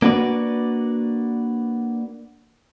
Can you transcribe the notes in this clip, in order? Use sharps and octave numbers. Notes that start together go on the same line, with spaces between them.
A#3 D4 F#4 B4 D5